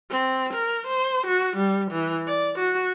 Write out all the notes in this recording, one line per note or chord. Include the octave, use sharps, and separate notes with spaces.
C4
A#4
C5
F#4
G3
E3
D5
F#4